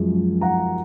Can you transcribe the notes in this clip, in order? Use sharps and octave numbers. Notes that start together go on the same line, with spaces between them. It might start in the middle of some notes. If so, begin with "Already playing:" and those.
Already playing: F#2 F3 G#3
F#5 A#5